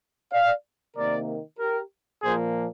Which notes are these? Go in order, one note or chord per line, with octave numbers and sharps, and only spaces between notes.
D5 F5
C3 D#3 A#3 A#4 D5
G4 A#4
A#2 F3 A#3 G#4 C5